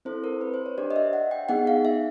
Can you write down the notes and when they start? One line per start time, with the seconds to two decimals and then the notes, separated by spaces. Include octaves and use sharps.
0.05 C4 E4 A4 C5
0.24 A#4
0.41 B4
0.54 C5
0.66 C#5
0.78 D4 G4 D5
0.91 D#5
0.96 E5
1.13 F#5
1.31 G5
1.49 B3 D#4 G#4 F#5
1.67 F5
1.85 E5